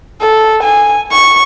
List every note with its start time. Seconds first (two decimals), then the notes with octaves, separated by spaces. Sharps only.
0.21 A4
0.63 G#5
1.11 C#6